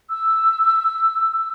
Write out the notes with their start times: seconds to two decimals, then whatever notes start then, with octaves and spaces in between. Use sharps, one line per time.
0.09 E6